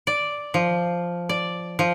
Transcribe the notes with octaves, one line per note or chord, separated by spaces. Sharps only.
D5
F3
D5
F3